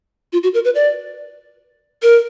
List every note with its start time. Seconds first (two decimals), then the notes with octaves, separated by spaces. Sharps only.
0.33 F4
0.43 F#4
0.54 A#4
0.65 B4
0.75 D5
2.03 A#4